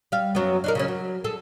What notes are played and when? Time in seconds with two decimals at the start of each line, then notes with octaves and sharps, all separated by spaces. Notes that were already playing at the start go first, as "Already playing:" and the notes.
0.12 G3 F5
0.35 F#2 F#3 B3
0.64 D4 D#4 A#4
0.75 C#3 F#3 C#4
0.88 F#3
1.24 G#4 A4